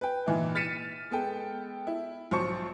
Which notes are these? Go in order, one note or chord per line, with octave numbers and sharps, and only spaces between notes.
B4 G5
A#2 E3 D#4 E4
F6 A6 B6 C#7 D#7 E7
G#3 B3 A4 G5
E4
B1 F3 C5 A5 C#6 C#7